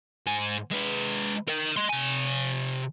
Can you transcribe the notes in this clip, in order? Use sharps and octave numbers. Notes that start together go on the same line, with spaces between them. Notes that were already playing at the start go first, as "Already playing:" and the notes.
G#2 G#5
G#3 B4
A#4 D#5
D#5 C6
C3 G#5